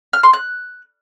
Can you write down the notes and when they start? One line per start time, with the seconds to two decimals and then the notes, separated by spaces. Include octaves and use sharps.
0.13 F6
0.23 C6
0.33 F#6